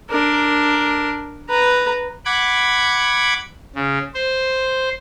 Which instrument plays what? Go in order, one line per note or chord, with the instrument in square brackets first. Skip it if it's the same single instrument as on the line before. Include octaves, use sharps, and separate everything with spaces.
[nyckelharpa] D4 A#4
B4 A#5
[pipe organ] F#5 B5 D6 G#6
C#3
C5